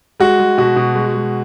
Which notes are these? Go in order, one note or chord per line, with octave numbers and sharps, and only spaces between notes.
G#3 F#4
G#3
B2 F#4
B2
G#3
G#3